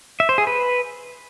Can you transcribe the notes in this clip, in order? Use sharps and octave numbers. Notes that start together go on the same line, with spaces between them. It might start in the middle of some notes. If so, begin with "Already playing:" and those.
E5
C5
G#4
B4